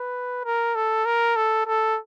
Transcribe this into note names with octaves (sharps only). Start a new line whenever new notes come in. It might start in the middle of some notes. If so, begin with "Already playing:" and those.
Already playing: B4
A#4
A4
A#4
A4
A4